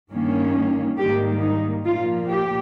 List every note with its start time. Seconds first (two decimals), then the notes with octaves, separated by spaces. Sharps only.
0.11 G2 D#3 A#3 C#4
0.98 G#2 D#3 G3 A#3 G4
1.41 D#4
1.85 A#2 F3 A#3 F4
2.29 G4